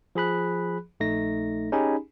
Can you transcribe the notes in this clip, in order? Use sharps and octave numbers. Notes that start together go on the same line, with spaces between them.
F3 G#4 B5 F#6
A#1 A3 D#4 A#6
C#4 D#4 G4 G#4 G#5 B5